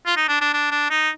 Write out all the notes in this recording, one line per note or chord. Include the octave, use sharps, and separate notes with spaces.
F4
D#4
D4
D4
D4
D4
D#4